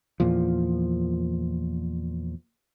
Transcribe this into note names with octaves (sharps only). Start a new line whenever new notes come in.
E2 A#2 F3